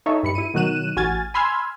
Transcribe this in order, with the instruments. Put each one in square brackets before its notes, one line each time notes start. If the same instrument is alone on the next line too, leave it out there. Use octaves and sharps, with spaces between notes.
[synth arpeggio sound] D#4 A4 C#5 D#5 E5
G2 B5 C#7
E4 D#7
B2 D#3 F#3 F#6 D#7 E7
A1 F#4 G#5 F6 G#6 A6
G#5 B5 C6 E6 F6 G#6